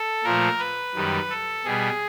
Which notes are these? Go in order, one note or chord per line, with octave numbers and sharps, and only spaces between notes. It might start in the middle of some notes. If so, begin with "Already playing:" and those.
Already playing: A4
A#2 F3 A3 A#4
B4
F#2 D#3 G3
A4
B2 G3 B3 G#4